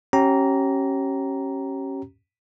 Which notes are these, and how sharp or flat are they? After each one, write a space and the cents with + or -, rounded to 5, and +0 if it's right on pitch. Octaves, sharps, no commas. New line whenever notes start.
C#4 -20 G4 -35 A#5 +0